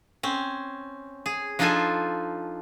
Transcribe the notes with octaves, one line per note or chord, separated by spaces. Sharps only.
C4 C#4
G#4
F3 D4 D#4 F4 A4 G#5